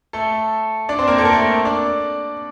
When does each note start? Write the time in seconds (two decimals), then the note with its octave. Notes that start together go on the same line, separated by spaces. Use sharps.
0.13 A3 A4
0.89 D4 D5
0.99 C4 C5
1.08 A#3 A#4
1.18 A4
1.25 A#4
1.33 A3 A4
1.65 D4 D5